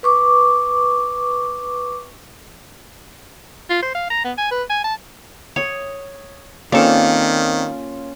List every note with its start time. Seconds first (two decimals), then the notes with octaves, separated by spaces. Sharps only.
0.03 B4 C#6 D6
3.70 F4
3.83 C5
3.95 F5
4.10 A#5
4.25 B3
4.38 G#5
4.52 B4
4.70 G#5
4.84 A5
5.56 C#5 D#6
6.72 D#3 A#3 C4 C#4 F4 A4 D5